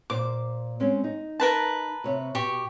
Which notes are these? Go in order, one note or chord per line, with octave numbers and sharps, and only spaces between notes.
A#2 C5 D6
G#3 C4 C#4
D#4
A#4 B4 A5
C3 C#5 E5
B2 G4 C#6